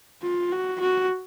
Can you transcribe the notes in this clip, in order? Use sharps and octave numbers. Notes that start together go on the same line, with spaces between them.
F4
F#4
F#4